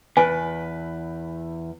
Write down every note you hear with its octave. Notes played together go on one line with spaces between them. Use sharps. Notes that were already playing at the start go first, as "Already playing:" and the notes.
E2 B4 G#5